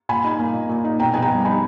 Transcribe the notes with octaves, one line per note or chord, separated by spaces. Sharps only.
A#2 G#5 B5
D#4
A#3
A#2
A#2
D#4
B2 G5 A#5
B3 G#5
G5 A#5
G3
D#4 G#5 B5